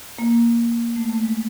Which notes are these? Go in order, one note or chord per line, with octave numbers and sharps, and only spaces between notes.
A#3
A3
A3
G#3